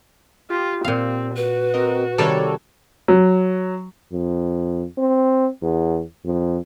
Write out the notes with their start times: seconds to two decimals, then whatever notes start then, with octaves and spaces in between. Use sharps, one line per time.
0.50 F4 G4
0.85 A#2 C4 F5
1.36 F#4 B4
1.74 C4 A#4 D#5
2.18 C3 D#3 G3 A4 C#5 D5
3.08 F#3
4.13 F2
4.98 C4
5.62 E2
6.25 F2